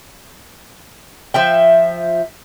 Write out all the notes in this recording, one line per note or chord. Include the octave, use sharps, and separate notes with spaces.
F3 E5 G5